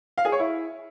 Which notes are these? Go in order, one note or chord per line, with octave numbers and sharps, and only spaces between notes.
F5
G#4
C#5
E4